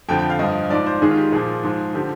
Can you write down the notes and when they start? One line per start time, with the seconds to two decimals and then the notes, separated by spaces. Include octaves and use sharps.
0.09 F2 D3 F3 G5
0.19 G5
0.30 F5
0.39 G2 F3 D#5
0.70 G#2 F3 D5
0.86 C5
1.01 G#2 D#3 G#4
1.10 F4
1.17 G4
1.32 A#2 F3 G#4
1.63 G#2 F3
1.94 D3 F3 G4